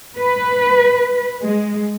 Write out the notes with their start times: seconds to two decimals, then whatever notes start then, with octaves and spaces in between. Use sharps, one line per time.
0.19 B4
1.42 G#3